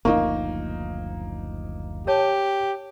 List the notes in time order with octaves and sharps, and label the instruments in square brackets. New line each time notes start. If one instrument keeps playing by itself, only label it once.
[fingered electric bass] F#1 D2 F3 [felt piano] A#3 D#4 [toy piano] C#6
[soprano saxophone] G4 [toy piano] A#4 C#5 A5